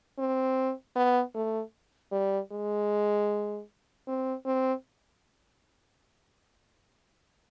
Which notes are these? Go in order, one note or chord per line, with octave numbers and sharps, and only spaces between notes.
C4
B3
A3
G3
G#3
C4
C4